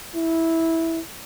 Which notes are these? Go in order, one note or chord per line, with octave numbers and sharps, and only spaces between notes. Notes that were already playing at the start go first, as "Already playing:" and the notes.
E4